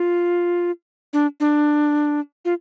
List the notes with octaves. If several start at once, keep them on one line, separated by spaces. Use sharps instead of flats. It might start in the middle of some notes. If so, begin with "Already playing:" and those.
Already playing: F4
D4
D4
F4